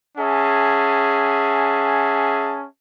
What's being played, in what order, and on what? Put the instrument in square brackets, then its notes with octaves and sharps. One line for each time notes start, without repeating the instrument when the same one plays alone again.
[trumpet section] C#4 G#4 E5 F#5 G#5 A5